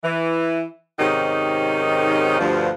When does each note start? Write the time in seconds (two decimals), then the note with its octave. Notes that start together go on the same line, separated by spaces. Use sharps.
0.04 E3
0.99 G#2 C3 D#3 C#4 D#4 G4
2.40 D2 G2 F3